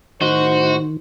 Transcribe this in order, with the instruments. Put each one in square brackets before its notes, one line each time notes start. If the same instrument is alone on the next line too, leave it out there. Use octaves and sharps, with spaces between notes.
[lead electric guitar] A2 D#5 [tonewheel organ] D#3 [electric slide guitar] F#4 [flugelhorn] C5